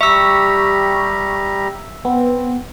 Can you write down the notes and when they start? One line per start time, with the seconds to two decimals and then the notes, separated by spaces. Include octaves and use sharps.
0.01 G3 G4 E5 A#5 C#6 E6
2.05 B3 C4